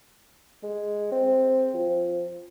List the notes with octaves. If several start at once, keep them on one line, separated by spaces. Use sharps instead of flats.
G#3
C4
F3